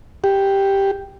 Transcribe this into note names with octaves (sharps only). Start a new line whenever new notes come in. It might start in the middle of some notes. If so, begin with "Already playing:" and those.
G4